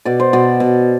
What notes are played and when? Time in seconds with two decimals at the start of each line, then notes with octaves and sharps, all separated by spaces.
0.05 B2 D5
0.20 C5
0.33 B2 D5
0.60 B2